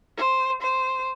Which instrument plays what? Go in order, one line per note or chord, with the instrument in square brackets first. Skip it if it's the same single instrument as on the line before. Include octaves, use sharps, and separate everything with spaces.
[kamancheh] C5
C5